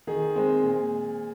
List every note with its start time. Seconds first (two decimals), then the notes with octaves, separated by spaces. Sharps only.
0.07 D#3 G#4
0.35 G#3 C4
0.63 A#2